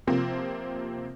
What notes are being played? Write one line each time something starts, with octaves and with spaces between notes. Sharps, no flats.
C3 F3 A#3 C4